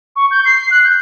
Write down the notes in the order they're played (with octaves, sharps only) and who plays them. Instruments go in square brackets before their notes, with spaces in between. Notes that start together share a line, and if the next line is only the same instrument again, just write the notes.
[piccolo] C#6
G6
C7
C7
F#6
G6